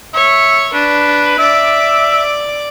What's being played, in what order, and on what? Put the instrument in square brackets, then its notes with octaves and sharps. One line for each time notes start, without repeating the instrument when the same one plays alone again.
[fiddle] C#5 C#6 [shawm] E5
[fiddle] D4 [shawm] B4
[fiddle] D5 D6 [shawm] E5